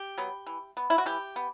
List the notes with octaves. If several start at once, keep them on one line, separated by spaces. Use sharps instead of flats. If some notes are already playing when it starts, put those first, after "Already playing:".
Already playing: G4
F#3 B3
E3
B3
E4
F#4
E3 G4
B3